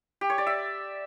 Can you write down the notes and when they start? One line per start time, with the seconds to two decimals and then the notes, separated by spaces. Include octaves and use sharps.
0.21 G4
0.30 C#5
0.38 D5
0.47 E5